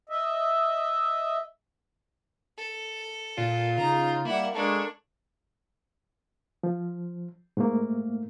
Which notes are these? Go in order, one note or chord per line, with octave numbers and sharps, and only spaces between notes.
D#5 E5
A4
A#2 F4
C#3 D#4 A#5
G3 A#3 E4 F#5
G#3 A#3 D4 A4 C#6
F3
G#2 A3 A#3